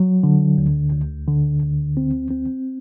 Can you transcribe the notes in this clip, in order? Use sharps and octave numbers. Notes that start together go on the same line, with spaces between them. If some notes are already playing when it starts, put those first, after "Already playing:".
Already playing: F#3
D3
D2
D2
D3
D2
C4
C4